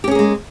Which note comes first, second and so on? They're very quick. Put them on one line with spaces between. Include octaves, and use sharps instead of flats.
G4 C#4 G#4 A#3 G#3